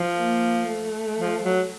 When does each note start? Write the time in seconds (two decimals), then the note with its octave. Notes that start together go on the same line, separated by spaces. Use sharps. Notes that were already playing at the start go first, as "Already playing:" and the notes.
Already playing: F3
0.17 A#3
0.67 A3
1.18 F3
1.43 F#3